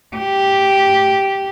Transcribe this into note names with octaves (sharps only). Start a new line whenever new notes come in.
G4